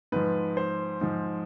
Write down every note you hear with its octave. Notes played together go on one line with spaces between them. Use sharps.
G#2 F3 B4
C5
G#2 F3